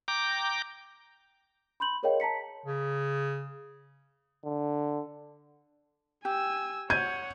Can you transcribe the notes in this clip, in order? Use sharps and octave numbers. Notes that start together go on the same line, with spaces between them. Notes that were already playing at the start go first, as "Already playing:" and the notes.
G5 A#5 D6
B5 C6 G6 F#7
G#4 A#4 C#5 D#5 F5 G5
A5 A#5 B6 C#7
C#3
D3
G4 G#5 E6
C#5 F#5 G6 G#6 D#7